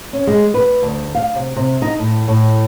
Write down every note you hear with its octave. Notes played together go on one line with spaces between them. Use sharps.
C#4
G#3
B4
D2
F5
C3
C3
D#4
A2
A2